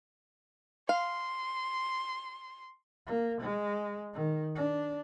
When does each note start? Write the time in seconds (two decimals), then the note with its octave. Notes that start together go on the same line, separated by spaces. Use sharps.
0.89 F5 C6
3.07 A#3
3.41 G#3
4.14 D#3
4.56 D4